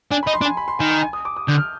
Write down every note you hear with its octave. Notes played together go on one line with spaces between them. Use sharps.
D4 G#5
B5
D#4
C6
D4
G#5
B5
C6
D#3 G#5
G#5
G#5
D#6
D6
D#6
D3 G6
F6